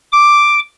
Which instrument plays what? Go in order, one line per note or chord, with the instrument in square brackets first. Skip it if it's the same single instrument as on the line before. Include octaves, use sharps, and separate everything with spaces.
[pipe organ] D6